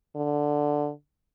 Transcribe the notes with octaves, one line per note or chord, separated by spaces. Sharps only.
D3